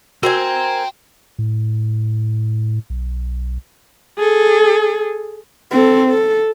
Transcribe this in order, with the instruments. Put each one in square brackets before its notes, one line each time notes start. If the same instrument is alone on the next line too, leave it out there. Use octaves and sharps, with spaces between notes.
[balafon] F#4 [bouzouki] A#4 C5 G#5 [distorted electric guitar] G5 C6
[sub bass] A2
B1
[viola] G#4 A4
[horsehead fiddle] C4 A4
A4